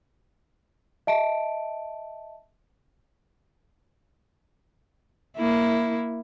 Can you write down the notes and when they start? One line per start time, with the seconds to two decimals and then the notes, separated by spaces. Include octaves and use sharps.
1.07 D#5 E5 A5 D7
5.37 A#3 E4